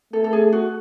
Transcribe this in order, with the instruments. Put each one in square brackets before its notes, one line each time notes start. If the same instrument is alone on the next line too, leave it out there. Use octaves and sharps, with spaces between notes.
[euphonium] A3 [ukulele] A4
[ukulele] A4
G#4
F#4